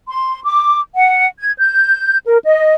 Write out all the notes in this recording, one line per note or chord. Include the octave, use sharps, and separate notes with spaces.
C6
D6
F#5
G#6
G6
A#4
D#5